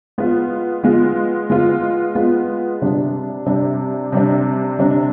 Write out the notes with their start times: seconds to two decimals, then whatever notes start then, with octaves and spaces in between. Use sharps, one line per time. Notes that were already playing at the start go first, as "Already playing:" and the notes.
0.18 G#3 B3 F4
0.83 G#3 B3 F4
1.50 G#3 B3 F4
2.15 G#3 B3 F4
2.81 C3 G3 D4
3.46 C3 G3 D4
4.12 C3 G3 D4
4.79 C3 G3 D4